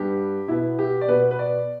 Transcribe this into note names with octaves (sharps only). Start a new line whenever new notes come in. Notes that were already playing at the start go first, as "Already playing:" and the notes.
Already playing: G2 G3 B3 G4
B2 B3 E4
G4
D5
B2 B3 B4
B4
D5